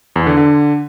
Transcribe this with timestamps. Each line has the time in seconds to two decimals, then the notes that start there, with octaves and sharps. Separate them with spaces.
0.16 E2
0.27 D3
0.38 D3